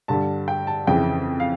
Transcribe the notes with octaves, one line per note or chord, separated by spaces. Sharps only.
G2 D3 G3 A5
G5
A5
F2 C#3 E3 G5
F5